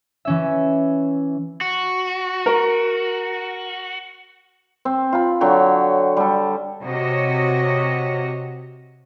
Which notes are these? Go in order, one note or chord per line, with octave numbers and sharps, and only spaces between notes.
E3 C#4 E5
F#4
A#4
C4
F4 B5
D3 F#3 C#5 G5
G3 A4
C3 F#4 C#5 D#5